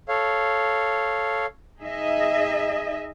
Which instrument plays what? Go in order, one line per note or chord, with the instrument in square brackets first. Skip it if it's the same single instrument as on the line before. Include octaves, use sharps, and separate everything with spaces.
[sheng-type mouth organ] A4 C#5 F5
[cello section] D#4 G#4 D#5 E5